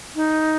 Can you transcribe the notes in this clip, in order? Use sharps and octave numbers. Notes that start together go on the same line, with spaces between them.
D#4